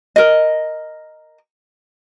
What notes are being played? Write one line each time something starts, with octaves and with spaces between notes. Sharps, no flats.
A#4 D#5